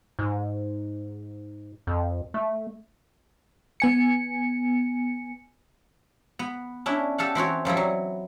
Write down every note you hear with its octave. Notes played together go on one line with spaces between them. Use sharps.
G#2
F2
A3
B3 G#5 C#7
B3
C#4 D4 E4
G4 A4 F5 F#5
E3 C4 F#4 C#5
F#2 F3 G3 E4
F#3